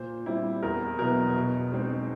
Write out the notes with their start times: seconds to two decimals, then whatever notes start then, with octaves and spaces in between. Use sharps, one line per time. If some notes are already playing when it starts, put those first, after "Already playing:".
Already playing: A#2 C5
0.26 G3 C4 E4
0.63 E2 A#4
0.99 B2 F#3 B3 E4 A#4
1.36 B2
1.71 G#3 C4 D#4